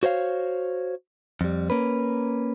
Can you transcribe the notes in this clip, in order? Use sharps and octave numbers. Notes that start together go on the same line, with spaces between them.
F#4 C5 C#5 F5
F2 G3
A#3 C#4 B4